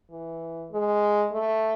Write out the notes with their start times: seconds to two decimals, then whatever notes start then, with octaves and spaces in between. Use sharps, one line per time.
0.11 E3
0.71 G#3
1.33 A3